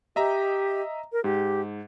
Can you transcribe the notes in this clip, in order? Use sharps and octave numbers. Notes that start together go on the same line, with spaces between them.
G4 D#5 E5 A#5
A#4
G#2 G4